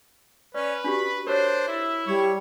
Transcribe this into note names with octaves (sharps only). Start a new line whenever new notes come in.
C#4 B4 D5
D4 F#4 G4 B5
D4 A#4 C5 C#5
E4 E5
G3 C#5